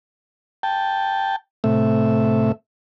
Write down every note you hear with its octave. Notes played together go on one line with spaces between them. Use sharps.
G5 A5
A2 C3 A3 E5